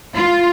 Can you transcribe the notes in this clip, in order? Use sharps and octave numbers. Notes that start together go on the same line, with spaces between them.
F4